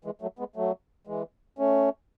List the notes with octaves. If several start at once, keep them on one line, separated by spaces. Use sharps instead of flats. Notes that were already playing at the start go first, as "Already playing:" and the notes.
E3 G#3
F#3 A3
G#3 B3
F#3 A3
E3 G#3
A3 C#4